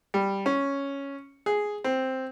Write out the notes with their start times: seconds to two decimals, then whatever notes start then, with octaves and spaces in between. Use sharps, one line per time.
0.14 G3
0.46 C#4
1.46 G#4
1.84 C4